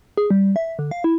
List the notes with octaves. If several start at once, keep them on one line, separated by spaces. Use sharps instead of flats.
G#4
G3
E5
D3
F5
E4